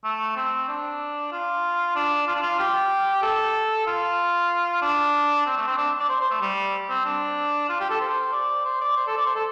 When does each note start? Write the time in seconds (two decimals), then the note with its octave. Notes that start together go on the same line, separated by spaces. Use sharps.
0.04 A3
0.36 C4
0.68 D4
1.32 F4
1.96 D4
2.27 F4
2.35 D4
2.42 F4
2.59 G4
3.22 A4
3.87 F4
4.82 D4
5.46 C4
5.57 A3
5.67 C4
5.78 D4
5.99 D5
6.09 C5
6.21 C5
6.31 A3
6.41 G3
6.89 C4
7.05 D4
7.69 F4
7.80 G4
7.90 A4
8.01 C5
8.32 D5
8.65 C5
8.81 D5
8.97 C5
9.07 A4
9.17 D5
9.26 C5
9.35 A4